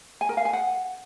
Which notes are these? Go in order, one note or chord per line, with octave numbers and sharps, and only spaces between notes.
G#5
A#4
F5
G#5
F#5